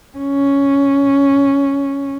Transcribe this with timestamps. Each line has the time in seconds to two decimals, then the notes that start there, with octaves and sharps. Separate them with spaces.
0.18 C#4